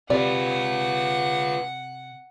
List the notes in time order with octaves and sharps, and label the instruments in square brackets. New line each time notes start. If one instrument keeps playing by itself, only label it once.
[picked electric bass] C3 [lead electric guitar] F4 B4 [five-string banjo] D5 [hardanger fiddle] F#5